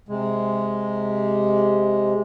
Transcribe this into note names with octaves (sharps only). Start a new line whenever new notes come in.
C3 G#3